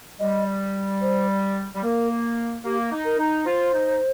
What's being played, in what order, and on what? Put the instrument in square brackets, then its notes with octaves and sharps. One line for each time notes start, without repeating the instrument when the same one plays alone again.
[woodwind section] G3 [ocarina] D#5
[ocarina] C5
[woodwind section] G3
[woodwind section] A#3 [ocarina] A#4
[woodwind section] A#3 [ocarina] G4
[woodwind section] D#4
[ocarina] A#4
[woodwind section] D#4
[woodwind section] F4 [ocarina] C5
[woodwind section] D#4